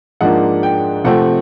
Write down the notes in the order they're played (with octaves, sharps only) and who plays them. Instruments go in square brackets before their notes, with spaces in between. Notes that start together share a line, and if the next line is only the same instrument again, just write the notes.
[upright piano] G#2 F3 A#3 D4 F#5
G5
C3 F3 A3 C4 F#5